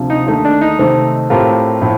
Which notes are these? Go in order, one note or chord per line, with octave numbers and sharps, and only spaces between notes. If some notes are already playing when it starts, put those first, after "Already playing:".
Already playing: D2 C3 F3
D#4
D#2 D3 A3 D#4
D4
D#4
C3 D#3 A3 C4
A2 A3 C4 F4 G4 A#4
A2 F3